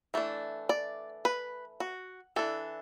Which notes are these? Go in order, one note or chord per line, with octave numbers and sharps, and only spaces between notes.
E3 A3 D4
D5
B4
F#4
E3 D4 A4